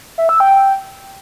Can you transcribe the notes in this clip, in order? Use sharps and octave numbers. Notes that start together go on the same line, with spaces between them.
E5
E6
G5